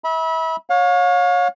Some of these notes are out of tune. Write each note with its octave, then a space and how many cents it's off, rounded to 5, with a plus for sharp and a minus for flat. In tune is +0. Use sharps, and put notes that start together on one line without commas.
E5 -35 B5 -25
C#5 +0 F5 +40